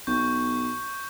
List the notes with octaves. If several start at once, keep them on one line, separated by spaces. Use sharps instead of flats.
B1 C#6 G6